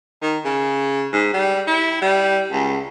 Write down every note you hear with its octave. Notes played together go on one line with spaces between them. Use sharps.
D#3
C#3
G#2
G3
E4
G3
C#2